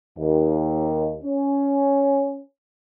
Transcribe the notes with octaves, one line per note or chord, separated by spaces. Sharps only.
D#2
C#4